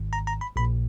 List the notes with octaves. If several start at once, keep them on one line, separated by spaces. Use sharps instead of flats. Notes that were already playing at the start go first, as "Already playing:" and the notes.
Already playing: G#1 G#2 D#3
A#5
A#5
B5
A#1 A#2 B5